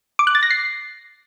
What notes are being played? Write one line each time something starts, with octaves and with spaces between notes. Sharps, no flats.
D6
F#6
A6
A#6
C7